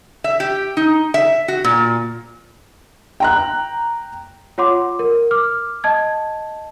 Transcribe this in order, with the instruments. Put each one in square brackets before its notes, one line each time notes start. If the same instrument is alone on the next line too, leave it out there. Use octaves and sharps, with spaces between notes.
[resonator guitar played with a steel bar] E5
G4
D#4
E5
F#4
A#2
[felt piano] G5 A#5 F#6
[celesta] F4 C#5 F#5 C6 D6
A#4
D6 F6
D#5 A5 G#6